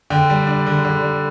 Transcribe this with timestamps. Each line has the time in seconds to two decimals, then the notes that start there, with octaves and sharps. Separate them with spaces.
0.10 D3 G5
0.30 G3
0.47 D4
0.67 D3
0.85 D3
1.02 G3